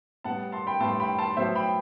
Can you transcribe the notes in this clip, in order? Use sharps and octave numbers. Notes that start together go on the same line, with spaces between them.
A2 G3 B3 F#5 A5
A5 C6
G5 B5
A2 G3 B3 A5 C6
G5 B5
A5 C6
A2 F#3 B3 C5 E5
G5 B5